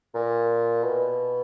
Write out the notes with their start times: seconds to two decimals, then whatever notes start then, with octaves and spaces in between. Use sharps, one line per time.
0.14 A#2
0.83 B2